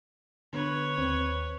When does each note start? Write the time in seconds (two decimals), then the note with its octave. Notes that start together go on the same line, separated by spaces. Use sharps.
0.53 D3 B3 B4 C#5
0.98 D#2 C4